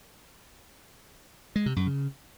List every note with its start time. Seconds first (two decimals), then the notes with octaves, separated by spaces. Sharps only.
1.56 G#3
1.66 C3
1.76 F#2
1.87 C#3